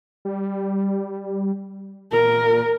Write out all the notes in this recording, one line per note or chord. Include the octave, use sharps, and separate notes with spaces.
G3
A#2 A#4